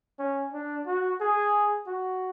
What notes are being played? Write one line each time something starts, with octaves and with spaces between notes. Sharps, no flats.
C#4
D4
F#4
G#4
F#4